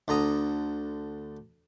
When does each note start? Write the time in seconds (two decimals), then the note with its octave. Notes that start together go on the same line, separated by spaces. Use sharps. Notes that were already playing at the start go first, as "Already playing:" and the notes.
0.08 D2 D3 A#5 D#6